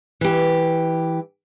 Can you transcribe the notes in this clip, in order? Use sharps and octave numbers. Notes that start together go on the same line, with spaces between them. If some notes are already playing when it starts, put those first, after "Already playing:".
E3 G4